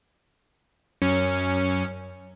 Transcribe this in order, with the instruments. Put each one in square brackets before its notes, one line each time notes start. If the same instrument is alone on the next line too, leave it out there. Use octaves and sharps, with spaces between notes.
[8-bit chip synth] F#2 C#4 C#7